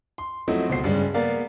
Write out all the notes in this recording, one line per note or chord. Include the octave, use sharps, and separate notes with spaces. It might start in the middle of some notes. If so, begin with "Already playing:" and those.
C6
F3 F#3 A3 C4 E4 D#5
C#2 B2 C5 C7
G2 C#3 G3 G#3
A#3 B3 A#4 D5 F5